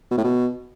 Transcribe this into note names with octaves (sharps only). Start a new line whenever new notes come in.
B2
A2
B2